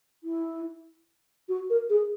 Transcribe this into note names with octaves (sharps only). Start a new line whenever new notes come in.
E4
F#4
A#4
G#4